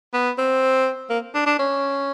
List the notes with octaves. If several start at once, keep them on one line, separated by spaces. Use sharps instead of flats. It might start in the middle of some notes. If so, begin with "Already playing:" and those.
B3
C4
A#3
D4
D4
C#4